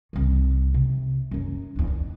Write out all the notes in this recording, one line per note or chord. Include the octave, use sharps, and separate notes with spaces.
C2 D#3
C3
F#2 F#3
E2 D4
D#3